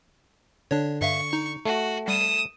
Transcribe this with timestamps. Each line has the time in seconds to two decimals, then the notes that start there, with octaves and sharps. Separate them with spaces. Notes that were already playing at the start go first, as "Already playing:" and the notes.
0.71 D3 D4 C#5
1.01 G2 E5 F5 C#6
1.33 D#4
1.65 A3 F#4
2.08 G3 D#6 E7